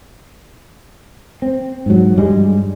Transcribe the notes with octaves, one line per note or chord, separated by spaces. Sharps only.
C4
G#2 F#3
G2 G3 G#3